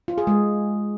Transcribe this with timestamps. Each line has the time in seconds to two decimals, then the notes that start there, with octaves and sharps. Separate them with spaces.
0.08 F4
0.18 G#4
0.27 G#3